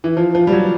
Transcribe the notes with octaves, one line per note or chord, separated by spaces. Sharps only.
E3
F3
F3
G3
F#3